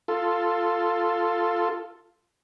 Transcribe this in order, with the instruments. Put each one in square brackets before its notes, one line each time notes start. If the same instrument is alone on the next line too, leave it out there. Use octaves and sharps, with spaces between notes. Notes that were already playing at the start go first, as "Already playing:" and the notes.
[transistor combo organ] F4 A4